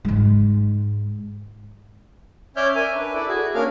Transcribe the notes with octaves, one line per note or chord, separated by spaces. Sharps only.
G#2 G#3
C#4 C#5 D5 E5 F6 G6
A#4 E5 G#5
D4 B4
E4 A4 D5
F#4 G#4
A#3 C#4 D4 A#4 F5 F6